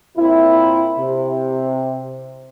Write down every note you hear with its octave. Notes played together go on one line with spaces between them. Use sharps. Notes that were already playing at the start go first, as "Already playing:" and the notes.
A#2 C4 E4
C3